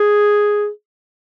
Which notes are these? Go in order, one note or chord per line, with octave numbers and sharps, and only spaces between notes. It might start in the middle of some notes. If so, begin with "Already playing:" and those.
Already playing: G#4